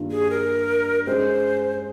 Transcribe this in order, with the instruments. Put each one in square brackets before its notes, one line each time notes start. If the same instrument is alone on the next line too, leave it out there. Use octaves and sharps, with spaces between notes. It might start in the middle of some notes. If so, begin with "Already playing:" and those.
Already playing: [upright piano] G2 D#3 A#3 F4
[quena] G#4
A#4
[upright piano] G#3 C#4 G#4 [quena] C5